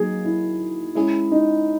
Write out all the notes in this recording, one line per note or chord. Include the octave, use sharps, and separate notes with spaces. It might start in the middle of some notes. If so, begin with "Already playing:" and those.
Already playing: F#3 A#3 D#4 G#4
E4
G#3 C#4 E4 G#4
D#4